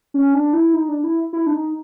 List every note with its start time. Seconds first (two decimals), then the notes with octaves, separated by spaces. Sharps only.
0.14 C#4
0.34 D4
0.53 E4
0.74 D#4
0.89 D4
1.04 E4
1.33 E4
1.47 D4
1.53 D#4